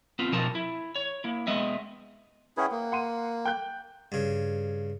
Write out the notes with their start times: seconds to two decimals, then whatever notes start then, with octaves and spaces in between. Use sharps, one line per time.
0.19 B3 C4 F4
0.32 B2 F3 D#4 A#4 A5
0.55 E4
0.95 C#5
1.24 A#3 E4
1.47 G#3 B3 D#5 E5
2.57 C#4 E4 G#4 B4 F#5 G5
2.72 A#3
2.92 F#5 C6 D#7
3.45 G5 F#6 G6
4.12 G2 C#3